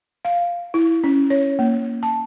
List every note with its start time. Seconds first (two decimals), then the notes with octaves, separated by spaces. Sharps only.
0.25 F5
0.74 E4
1.04 C#4
1.30 C#5
1.59 A#3
2.03 A5